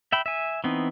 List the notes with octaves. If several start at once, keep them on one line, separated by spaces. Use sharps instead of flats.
E5 G5 B5
E5 G#5
E3 B3 C4 D#4